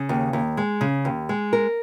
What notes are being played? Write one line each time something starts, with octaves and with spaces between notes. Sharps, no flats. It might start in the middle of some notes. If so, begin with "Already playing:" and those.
Already playing: C#3
D#2
D#2
G#3
C#3
D#2
G#3
A#4